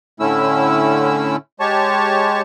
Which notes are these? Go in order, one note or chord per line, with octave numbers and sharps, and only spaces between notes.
A2 D3 A3 C#4 E4 E6
G#3 G4 C#5 A5 C#6